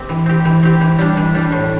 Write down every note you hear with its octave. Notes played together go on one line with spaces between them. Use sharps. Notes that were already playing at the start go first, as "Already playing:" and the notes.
Already playing: C4 G4
E3
C4 G4
E3
C4 G4
E3
G3 D4
E3
G3 D4
A2